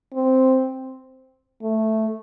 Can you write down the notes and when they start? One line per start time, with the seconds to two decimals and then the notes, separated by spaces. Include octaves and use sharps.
0.14 C4
1.62 A3